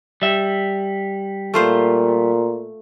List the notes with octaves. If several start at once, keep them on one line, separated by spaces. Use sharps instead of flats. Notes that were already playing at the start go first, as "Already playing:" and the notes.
G3 E5
A#2 A3 F4 C5